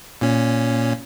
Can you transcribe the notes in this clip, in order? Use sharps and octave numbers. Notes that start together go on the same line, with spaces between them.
A#2 C#4